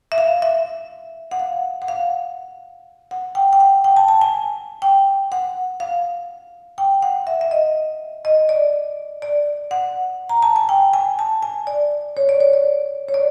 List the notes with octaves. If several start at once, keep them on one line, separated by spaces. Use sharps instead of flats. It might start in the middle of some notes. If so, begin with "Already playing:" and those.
E5
F5
E5
F#5
F5
F#5
F5
F#5
G5
G5
F#5
G5
A5
A5
G#5
G5
F#5
F5
G5
F#5
E5
E5
D#5
D#5
D5
D5
F#5
A#5
A5
G#5
G5
G#5
A5
G#5
D5
C#5
D5
C#5
D5
C#5
D5